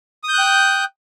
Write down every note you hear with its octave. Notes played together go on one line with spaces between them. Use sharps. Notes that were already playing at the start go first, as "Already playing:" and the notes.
G5 D#6 F#6 G6